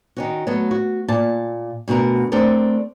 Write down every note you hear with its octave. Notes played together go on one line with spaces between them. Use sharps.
D#3 C#4 F#4
F#3 A3 B3
F#4
A#2 A5
D2 B2 F#4 A#4
A3 C4 D4 A4 A#4